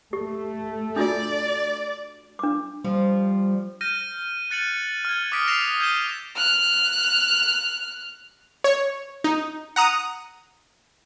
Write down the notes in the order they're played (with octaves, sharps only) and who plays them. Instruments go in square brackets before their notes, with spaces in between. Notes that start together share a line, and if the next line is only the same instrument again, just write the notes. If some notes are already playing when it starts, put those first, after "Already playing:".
[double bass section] A3 [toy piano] G4
[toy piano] D4 F4 F#4 [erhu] D5
[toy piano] D4 D6
[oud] F3 [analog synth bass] G3
[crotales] F6 G6 A#6 D#7
F#6 A6 C#7 D#7 F#7
F6 G#6
D6 D#6 B6 D7
E6 A#6 C7 E7 F7
G6 G#6 D#7 E7 G7
[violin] F6 F#6
[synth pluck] C#5
D#4
F#5 A#5 D#6